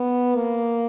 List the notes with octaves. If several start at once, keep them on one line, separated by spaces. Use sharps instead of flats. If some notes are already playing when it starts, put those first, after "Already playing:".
Already playing: B3
A#3